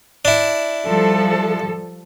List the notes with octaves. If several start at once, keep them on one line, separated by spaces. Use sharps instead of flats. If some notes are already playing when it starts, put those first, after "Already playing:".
D4 E4
F3 G3 A4